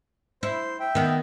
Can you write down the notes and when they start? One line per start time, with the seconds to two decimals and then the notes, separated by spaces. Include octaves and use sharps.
0.43 E4 C5
0.80 E5 G5
0.95 D#3 B3